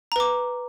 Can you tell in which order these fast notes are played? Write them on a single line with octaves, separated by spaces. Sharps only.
A#5 B4 D6